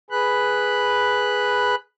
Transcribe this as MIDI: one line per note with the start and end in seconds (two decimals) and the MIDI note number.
0.11 1.75 68
0.11 1.75 71
0.11 1.75 83
0.11 1.75 90